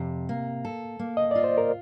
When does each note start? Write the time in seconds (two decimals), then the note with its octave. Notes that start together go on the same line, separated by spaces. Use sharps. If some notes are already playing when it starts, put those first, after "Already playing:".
Already playing: F2 C3
0.29 A#3
0.65 A4
0.99 A#3
1.17 D#5
1.31 F4 D5
1.44 C5
1.58 A#4